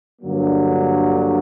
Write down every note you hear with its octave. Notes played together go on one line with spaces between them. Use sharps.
G2 D3 F#3 A#3